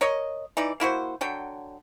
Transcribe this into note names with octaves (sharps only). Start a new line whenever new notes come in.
A#4 C#5 D#5
E3 D#4 D5
A#3 E4 F#4 C5
D3 F#3 G5